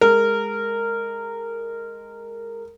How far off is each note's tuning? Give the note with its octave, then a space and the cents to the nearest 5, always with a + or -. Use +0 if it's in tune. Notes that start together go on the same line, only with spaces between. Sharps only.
G#3 +0 A#4 -15